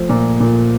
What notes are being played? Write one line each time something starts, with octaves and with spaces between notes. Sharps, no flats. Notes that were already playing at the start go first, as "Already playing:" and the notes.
Already playing: F3 A3
A#2
A#2